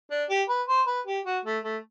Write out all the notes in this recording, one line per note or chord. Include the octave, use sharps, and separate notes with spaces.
D4
G4
B4
C5
B4
G4
F#4
A3
A3